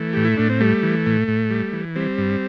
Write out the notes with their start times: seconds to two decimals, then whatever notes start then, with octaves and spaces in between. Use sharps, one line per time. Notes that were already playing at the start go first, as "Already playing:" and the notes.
Already playing: E3 A3
0.13 A2 G4
0.25 E4
0.37 A2 D4
0.49 C4
0.60 G3 A3
0.83 E3
1.06 A2
1.28 A2
1.50 G3
1.73 E3
1.96 G3 C4
2.18 G2